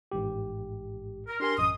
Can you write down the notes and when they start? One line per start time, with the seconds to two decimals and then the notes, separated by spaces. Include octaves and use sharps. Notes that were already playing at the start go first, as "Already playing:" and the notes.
0.12 A1 G#2 G4
1.27 A#4
1.40 D4 G4 A#4 G#5 C6
1.57 A1 F#2 D#5 D#6